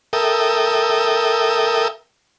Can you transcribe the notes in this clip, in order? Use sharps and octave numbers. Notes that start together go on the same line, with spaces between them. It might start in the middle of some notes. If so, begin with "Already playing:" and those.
A4 A#4 E5 G5 D#6